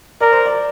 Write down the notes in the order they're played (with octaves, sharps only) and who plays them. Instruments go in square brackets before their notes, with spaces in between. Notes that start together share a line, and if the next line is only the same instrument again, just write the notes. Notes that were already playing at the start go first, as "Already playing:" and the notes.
[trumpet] A#4 [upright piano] D5
[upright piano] C5
D5